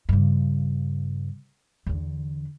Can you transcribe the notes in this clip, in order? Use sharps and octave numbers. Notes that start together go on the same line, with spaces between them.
G2 C#3
E2 D3